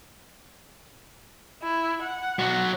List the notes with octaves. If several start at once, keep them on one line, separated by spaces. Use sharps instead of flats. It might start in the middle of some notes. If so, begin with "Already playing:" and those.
E4
F#5
B1 F#3